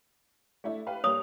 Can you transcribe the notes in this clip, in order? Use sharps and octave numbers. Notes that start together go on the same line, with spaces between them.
A3 D4 E4
G4 B4 F5
G2 A#3 C#5 D#6 F7